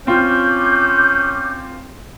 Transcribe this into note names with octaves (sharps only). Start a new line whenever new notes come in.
C4 C#4 F4 D6 G6